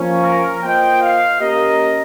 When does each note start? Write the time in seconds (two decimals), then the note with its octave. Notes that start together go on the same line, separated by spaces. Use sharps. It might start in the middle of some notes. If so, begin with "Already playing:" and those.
Already playing: F3 A#3 C#4
0.24 A#4
0.63 A#3 F4 C5 D#5 G5
1.01 F5
1.40 A#3 C#4 G4 A#4 D#5